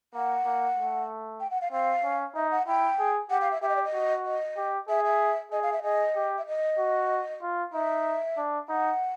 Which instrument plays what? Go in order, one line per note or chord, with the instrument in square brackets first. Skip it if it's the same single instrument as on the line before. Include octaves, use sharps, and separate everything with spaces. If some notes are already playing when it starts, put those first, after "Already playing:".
[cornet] A#3 [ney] F#5
[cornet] A#3
A3
[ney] G5
F#5
F5
[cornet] C4 [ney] F5
[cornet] C#4
[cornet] D#4 [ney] E5
[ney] F#5
[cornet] E4 [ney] G5
[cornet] G#4
[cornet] G4 [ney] F#5
[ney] F5
E5
[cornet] G4 [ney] E5
[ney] D#5
D5
D#5
[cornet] F#4
[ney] D#5
[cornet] G4
[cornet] G#4 [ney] E5
[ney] E5
[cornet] G#4 [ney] D#5
[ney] F5
E5
[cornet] G#4 [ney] D#5
[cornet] G4
[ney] E5
D#5
[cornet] F#4
F4
[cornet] D#4 [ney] E5
[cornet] D4
[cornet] D#4 [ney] F#5